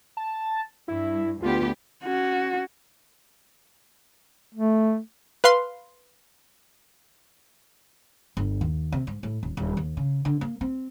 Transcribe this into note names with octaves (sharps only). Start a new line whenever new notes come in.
A5
G2 E4
D2 B3 F4 G4
C#4 F#4
A3
B4 F5 C6
G1
D#2
C3
G#2
A2
D#1
D#1
D#2
C#3
D3
A#3
C4